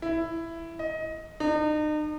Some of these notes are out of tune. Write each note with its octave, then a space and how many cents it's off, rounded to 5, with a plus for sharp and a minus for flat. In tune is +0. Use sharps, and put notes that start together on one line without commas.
E4 +10
D#5 +20
D#4 -40